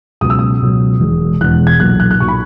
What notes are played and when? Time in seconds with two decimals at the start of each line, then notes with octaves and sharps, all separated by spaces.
0.21 C#2 B2 F#3 D#6
0.30 E6
0.39 D#6
0.61 C#2 B2 F#3
1.00 E1 E2 B2 G#3
1.40 E1 E2 B2 G#3 F#6
1.67 G#6
1.80 B1 A#2 F#3 A#3 F#6
2.00 F#6
2.11 F#6
2.20 B1 A#2 F#3 A#3 C#6
2.28 B5